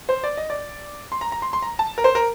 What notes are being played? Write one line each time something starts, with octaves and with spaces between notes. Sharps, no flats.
C5
D5
D#5
D5
C6
A#5
A#5
C6
C6
A#5
A5
A#4
C5
A#4